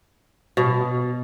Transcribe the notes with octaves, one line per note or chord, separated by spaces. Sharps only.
B2